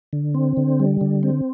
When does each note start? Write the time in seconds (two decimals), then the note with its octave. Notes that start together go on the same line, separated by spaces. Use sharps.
0.13 D3
0.34 C4
0.57 D3
0.80 G3
1.01 D3
1.23 C4